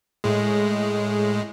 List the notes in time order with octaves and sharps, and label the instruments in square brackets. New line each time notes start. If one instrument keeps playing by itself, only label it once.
[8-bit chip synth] A2 G#3